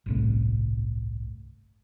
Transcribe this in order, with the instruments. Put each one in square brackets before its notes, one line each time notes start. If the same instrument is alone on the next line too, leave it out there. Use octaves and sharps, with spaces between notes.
[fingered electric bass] G1 C2 A2